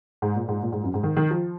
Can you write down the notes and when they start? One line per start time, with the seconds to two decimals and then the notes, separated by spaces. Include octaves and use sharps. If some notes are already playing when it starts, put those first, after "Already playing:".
0.22 G#2
0.36 A#2
0.48 G#2
0.63 A#2
0.72 G#2
0.84 F#2
0.94 G#2
1.03 D#3
1.17 D#3
1.31 F3